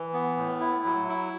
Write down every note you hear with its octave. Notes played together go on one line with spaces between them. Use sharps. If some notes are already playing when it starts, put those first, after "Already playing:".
Already playing: E3
B3
A2
E4
F#3
E4